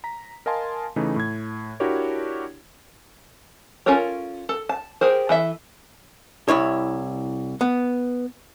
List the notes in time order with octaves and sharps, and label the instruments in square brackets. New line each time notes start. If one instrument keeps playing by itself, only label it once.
[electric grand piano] A#5 B6
A#4 D#5 F5 G#5 A5 C6
C#3 E3 A3 D#4
A2 G#6
D4 E4 F#4 G4 A#4 C#5
[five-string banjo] C#4 F4 A4 A#4 C#5
A4
A5
G4 G#4 A#4 C5
E3 A4 E5
[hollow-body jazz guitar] C2 E4 C#5
B3